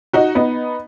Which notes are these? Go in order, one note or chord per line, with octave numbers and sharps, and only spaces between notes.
D#4 F#4
B3 D#4